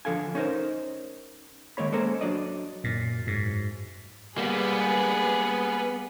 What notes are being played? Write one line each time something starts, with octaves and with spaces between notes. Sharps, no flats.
D3 F3 F4 A4 F5 G#5
C#4 D#4 A#4 C5
D#3 G#3 A#3 C#5 B5
G#3 A#3 C#4 A4 C5 A#5
F#3 D4 D5 D#5
F#2 A#2
G#2
G3 A#3 B3 G#4 B4